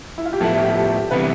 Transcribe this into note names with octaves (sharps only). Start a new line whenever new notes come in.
E4
F4
G4
A2 F3 B3 E4 A4
G4
A4
C3 E3 G3 B3 B4